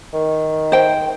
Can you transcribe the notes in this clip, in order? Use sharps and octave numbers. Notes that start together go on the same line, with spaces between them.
D#3
C5 G5